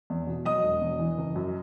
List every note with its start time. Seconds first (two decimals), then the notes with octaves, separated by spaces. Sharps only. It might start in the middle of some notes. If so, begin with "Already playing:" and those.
0.10 E2
0.27 B2
0.45 F#3 D#5 D#6
0.63 E1
0.81 E2
0.99 E3
1.18 F#1
1.36 F#2